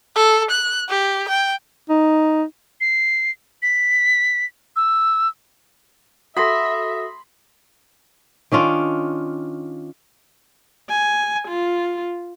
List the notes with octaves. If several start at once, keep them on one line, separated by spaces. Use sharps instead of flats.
A4
F#6
G4
G5
D#4
C7
B6
E6
F#4 A4 E5 B5 C6 D#6 A#6
D#3 C#4 D4 F4
G#5
F4